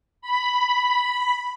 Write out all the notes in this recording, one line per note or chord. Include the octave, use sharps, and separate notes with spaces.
B5